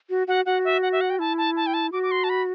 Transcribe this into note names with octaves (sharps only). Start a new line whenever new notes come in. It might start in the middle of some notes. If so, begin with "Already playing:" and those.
F#4
F#4 F#5
F#4 F#5
E5
F#5
E5
F#5
G5
E4 A5
A5
A5
G5
A5
F#4 D6
D6
C6
A5
B5